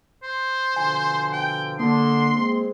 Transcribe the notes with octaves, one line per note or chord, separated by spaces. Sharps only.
C5
B2 D3 F3 G#5
G5
D3 A#3 C6
G#3 C4